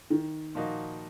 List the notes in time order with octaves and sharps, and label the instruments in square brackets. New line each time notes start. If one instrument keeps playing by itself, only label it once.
[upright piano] D#3
[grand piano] A#2 F3 A#3 D#4 F#4